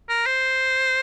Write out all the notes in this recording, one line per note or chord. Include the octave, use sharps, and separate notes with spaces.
A#4
C5